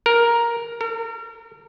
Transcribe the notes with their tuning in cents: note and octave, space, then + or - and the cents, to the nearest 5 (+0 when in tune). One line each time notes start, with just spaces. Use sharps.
A#4 +5
A#4 -40